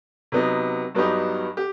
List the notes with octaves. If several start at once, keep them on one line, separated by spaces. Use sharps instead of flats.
C3 F#3 B3 D#4
G2 F#3 B3 D#4 G4
G4